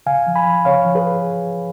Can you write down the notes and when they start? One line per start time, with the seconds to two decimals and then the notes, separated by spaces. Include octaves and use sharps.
0.06 C#3 F5 G#5
0.27 F3
0.36 G#5 B5
0.46 F3
0.65 C#3 C#5 F5
0.85 F3
0.95 G#4 B4